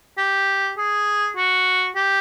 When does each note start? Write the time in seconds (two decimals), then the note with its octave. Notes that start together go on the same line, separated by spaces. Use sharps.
0.18 G4
0.77 G#4
1.36 F#4
1.95 G4